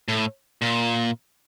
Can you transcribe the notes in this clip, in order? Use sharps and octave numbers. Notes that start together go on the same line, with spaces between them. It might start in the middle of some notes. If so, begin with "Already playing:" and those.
A2
A#2